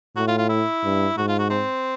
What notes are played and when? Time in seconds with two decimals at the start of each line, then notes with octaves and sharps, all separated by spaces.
0.16 A2 F#4
0.28 F4
0.38 F4
0.49 E4
0.84 G2
1.17 G#2 F#4
1.28 F4
1.39 F#4
1.50 C4